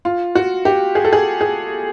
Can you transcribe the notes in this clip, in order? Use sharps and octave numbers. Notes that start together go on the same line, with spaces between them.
F4
F#4
G4
G#4
A4
G#4
G#4